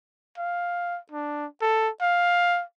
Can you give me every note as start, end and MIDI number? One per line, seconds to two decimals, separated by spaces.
0.38 0.98 77
1.12 1.46 62
1.61 1.89 69
2.01 2.63 77